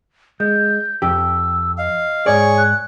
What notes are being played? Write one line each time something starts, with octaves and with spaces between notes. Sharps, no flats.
G#3 G6
F2 G4 E6
D#5 F5
G#2 G#4 C#5 D5 C#6
F#6